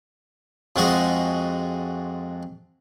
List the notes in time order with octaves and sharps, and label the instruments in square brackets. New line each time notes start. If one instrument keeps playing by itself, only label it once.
[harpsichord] F2 F3 G#3 F#4 D#5